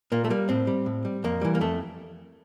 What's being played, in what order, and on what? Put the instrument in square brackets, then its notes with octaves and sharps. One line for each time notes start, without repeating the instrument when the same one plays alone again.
[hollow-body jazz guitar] A#2 A#3
A3
G3 A#3
A2 C4
G3
A2
G3
F2 A#3
E3 G3
A#3
F2 A3